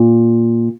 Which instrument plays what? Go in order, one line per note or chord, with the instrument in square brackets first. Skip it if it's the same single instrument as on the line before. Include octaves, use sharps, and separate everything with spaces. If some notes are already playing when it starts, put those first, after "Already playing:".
Already playing: [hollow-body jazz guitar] A#2